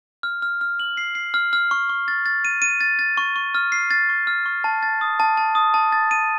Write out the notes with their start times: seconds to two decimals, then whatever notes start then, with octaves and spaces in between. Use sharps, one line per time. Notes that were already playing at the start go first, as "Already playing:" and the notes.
0.23 F6
0.42 F6
0.61 F6
0.80 F#7
0.97 C7
1.15 C7
1.34 F6
1.53 F6
1.71 C#6
1.89 C#6
2.08 A6
2.26 A6
2.45 D#7
2.62 D#7
2.81 A6
2.99 A6
3.17 C#6
3.36 C#6
3.55 F6
3.72 C7
3.91 A6
4.09 C#6
4.27 F6
4.46 C#6
4.64 A5
4.83 A6
5.01 D#6
5.20 A5
5.37 A5
5.55 D#6
5.74 A5
5.92 A6
6.11 D#7